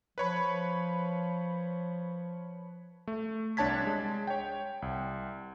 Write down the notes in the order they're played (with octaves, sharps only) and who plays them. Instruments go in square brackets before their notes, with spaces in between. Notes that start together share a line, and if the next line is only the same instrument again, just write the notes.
[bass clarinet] F3 [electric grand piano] B4 C#5 B5
[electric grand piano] A3
C2 D4 C#5 A5 G#6 B6
G#3
C#5 G5
C2